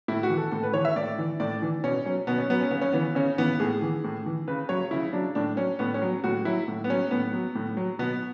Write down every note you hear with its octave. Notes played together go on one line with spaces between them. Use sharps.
A2 E4
F#4
E3
A4
A2 A4
B4
E3 C#5
E5
A2 D5
E3
A2 D5
E3
B2 C#4
F#3 C#4
B2 B3
C#4
F#3 B3
C#4
C#3 B3
C#4
E3 B3
C#3 C#4
E3 B3
A2 G#4
E3
A2
E3
C#3 B4
F#3 C#5
C#3 E4
F#3 D4
A2 D4
F#3 C#4
A2 B3
C#4
F#3
A2 F#4
F#3 E4
A2
B3
F#3 C#4
A2 B3
F#3
A2
F#3
B2 B3